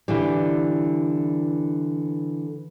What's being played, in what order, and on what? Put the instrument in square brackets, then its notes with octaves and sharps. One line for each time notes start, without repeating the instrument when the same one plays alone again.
[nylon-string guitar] D3 E3 G3